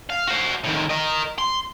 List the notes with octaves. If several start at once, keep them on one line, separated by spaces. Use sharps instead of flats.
F5
F#4 C5
A2 D#3
A#4 D#5
C6